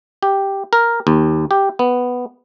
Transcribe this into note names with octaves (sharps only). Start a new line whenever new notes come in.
G4
A#4
D#2
G4
B3